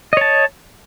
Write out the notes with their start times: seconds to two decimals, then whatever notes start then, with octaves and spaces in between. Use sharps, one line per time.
0.13 D#5
0.17 C#5
0.21 A5